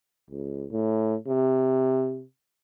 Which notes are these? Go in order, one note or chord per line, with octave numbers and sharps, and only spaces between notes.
C#2
A2
C3